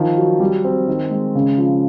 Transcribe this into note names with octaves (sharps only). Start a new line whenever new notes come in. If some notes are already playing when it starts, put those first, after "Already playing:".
Already playing: D#3 F3
F#3
G3
C4
D#3
G#3
C#3
F3